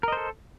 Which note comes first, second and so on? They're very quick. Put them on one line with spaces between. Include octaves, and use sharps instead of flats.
A#4 D#5 C5 A4